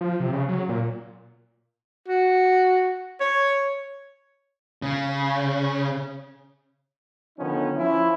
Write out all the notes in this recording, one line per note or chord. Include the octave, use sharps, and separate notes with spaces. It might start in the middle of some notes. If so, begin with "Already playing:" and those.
F3
C3
C#3
F#3
A#2
F#4
C#5
C#3
D3 D#3 F3 B3 C#4 D#4
F3 C#4 E4